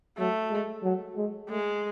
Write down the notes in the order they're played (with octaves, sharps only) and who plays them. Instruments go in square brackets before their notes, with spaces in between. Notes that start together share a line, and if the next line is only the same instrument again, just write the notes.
[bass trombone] F#3 [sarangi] A3
[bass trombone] G#3
F#3
G#3
[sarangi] G#3 [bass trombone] A3